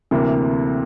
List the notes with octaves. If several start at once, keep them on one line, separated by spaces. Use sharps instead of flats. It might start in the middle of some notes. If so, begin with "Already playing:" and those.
D2 C3 E3 A#3